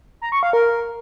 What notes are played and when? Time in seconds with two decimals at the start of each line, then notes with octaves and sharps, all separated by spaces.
0.22 A#5
0.32 C#6
0.43 F5
0.53 A#4